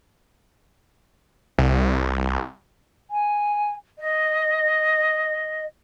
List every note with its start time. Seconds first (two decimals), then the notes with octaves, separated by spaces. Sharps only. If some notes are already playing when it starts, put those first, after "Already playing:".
1.58 C2
3.10 G#5
3.98 D#5